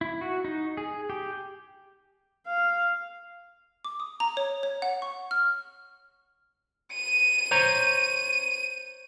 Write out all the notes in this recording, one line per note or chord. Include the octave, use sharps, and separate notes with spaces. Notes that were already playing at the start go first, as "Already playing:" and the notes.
E4
F#4
D#4
G#4
G4
F5
D6
D#6
A#5
C#5
C#5
F#5
C#6
F6
D#7
C5 C#5 A#5